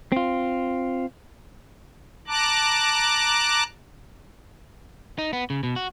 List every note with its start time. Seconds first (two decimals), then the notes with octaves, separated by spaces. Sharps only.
0.12 C4 F4
2.28 A5 A#5 D6 F#6
5.18 D#4
5.33 B3
5.50 C#3
5.63 B2
5.76 F#4